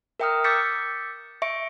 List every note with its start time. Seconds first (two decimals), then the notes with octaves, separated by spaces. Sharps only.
0.20 A#4 E5 G5 A#5 D#6 F6
0.44 D6 E6 G6 A6 B6 C#7
1.42 E5 C#6 C#7 D7